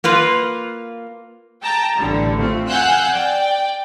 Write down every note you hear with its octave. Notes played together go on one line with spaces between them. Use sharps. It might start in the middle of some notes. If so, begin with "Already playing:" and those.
A#3 F4 B4
G5 A5 A#5
A1 D3 G3
A3 C4 F4
F5 F#5 G#5 E6 F#6 G6
D5 G5